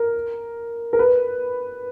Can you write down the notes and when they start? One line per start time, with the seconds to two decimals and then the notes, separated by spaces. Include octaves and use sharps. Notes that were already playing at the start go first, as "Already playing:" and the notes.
Already playing: A#4
0.93 A#4
0.99 B4